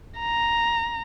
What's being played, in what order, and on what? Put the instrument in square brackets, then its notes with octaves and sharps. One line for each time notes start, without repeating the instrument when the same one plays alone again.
[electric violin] A#5